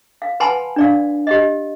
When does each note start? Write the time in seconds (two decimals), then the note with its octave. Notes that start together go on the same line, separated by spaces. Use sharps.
0.22 F5
0.40 B4 F#5 G#5 A5 B5 C6
0.76 D4 D5 F5
1.27 G4 D#5